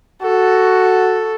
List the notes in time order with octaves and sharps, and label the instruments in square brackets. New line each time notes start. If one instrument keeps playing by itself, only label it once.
[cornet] F#4 [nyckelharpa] A4